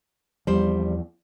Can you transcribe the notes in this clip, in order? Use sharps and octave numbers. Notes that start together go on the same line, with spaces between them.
E2 F3 G3 C5